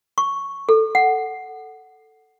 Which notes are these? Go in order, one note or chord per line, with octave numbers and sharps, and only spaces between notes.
C#6
A4
F#5